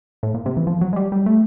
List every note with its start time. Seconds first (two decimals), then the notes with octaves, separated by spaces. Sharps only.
0.23 A2
0.34 A#2
0.46 C3
0.57 E3
0.67 F3
0.81 F#3
0.93 G#3
0.96 G3
1.12 G3
1.26 A3